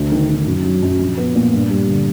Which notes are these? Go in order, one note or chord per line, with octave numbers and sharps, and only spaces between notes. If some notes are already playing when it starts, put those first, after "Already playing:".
Already playing: D2
D#3
D#3
F#2
F#3
F#2
A#1
B3
A#2
G2
G3
D3